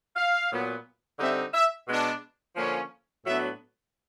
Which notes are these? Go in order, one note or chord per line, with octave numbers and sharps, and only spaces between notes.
F5
A#2 F#3 B3
D3 G3 C4 D#4 E5
E5
B2 G#3 B3 D4
D3 F3 A#3 C#4
A2 F#3 B3 D4 E5